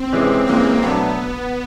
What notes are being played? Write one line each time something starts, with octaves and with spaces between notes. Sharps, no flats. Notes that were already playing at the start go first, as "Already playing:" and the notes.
Already playing: C4
C3 E3 G#3 C#4
C3 E3 G#3 A#3 C#4
B2 F#3 A3 B3 D4